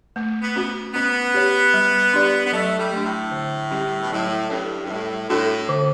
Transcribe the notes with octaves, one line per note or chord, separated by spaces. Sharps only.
A3
B3
C#4 F#4
B3 C#4
G4 C#5
G3
D4 G4 D5
B3
F#3 A3
G3
A3 D4
A2
D3
G3 C#4 E4 G4
B2
A2 F#3
G2 C#4 E4 A4 C#5
G2
A2 G3
A2 D4 F#4 A4
D3